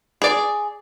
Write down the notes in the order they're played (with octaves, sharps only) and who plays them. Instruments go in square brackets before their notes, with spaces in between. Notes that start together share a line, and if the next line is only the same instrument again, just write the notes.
[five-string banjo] G#4 D5